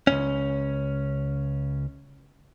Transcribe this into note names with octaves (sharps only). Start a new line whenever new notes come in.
C#2 G2 C#4